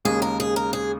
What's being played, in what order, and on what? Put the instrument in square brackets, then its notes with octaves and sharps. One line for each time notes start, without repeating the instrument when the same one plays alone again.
[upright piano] D#2 C#3 G#3 [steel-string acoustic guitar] G#4
[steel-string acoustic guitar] A#4
G#4
A#4
G#4